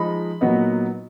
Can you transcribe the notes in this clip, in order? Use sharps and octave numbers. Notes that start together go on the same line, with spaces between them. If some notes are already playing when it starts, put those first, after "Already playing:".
Already playing: F3 G#3 D#4 B5
A#2 F#3 B3 D#4